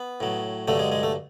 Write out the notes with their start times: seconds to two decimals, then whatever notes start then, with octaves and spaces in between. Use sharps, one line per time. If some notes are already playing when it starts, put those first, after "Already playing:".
Already playing: B3
0.20 A2 F#3
0.68 G2 D3 F#3 A3
0.79 G#3
0.92 G#3
1.03 A3